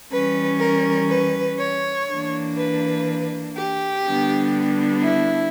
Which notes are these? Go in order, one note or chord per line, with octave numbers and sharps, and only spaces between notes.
E3 G3 C#4 B4
A#4
B4
C#5
E3 A#3 D4
B4
G4
D3 G3 B3 D4
E4